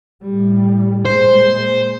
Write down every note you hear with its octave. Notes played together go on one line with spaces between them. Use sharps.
A2 G3
A#2 G#3 C5